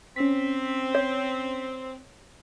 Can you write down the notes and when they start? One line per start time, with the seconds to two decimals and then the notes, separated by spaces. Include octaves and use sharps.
0.16 C4 C#4 B6
0.95 C#5